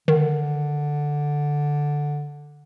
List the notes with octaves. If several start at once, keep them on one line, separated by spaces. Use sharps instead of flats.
D3 D#3